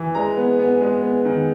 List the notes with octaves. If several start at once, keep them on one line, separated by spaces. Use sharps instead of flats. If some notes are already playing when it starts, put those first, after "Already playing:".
Already playing: E3
G#3 A#5
B3
B3
G#3
B3
D#3